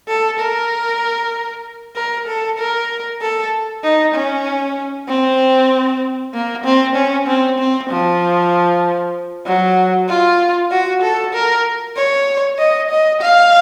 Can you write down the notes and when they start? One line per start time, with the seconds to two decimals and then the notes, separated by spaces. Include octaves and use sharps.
0.08 A4
0.39 A#4
1.96 A#4
2.27 A4
2.59 A#4
3.21 A4
3.84 D#4
4.15 C#4
5.08 C4
6.34 A#3
6.64 C4
6.96 C#4
7.27 C4
7.59 C4
7.90 F3
9.46 F#3
10.09 F4
10.71 F#4
11.02 A4
11.34 A#4
11.96 C#5
12.58 D#5
12.90 D#5
13.21 F5